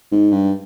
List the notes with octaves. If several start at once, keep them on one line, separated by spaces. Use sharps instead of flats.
G#2
G2